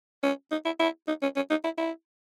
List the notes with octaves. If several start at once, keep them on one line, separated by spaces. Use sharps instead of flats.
C#4
D#4
E4
E4
D#4
C#4
C#4
D#4
E4
E4